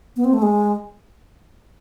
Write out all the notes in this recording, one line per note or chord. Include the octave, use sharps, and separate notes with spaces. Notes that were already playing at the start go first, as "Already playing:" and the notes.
B3
C4
A3
G#3